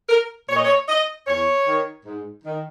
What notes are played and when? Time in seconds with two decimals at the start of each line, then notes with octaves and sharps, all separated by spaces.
0.09 A#4
0.49 A#2 C#5
0.57 D#5
0.65 C#5
0.88 D#5
1.27 E2 C#5
1.66 D#3
2.05 G#2
2.44 D#3